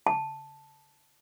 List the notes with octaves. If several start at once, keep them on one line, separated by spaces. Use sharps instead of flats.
A5